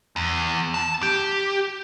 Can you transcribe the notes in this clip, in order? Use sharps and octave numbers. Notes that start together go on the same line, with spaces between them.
E2
A5
G4